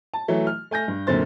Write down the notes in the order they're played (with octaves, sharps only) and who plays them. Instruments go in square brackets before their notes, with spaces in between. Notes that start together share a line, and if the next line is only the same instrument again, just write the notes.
[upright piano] A5
E3 F#3 A3
F6
A3 G#5 G6 A#6
G2
F#2 A#2 D3 C4 C5 A6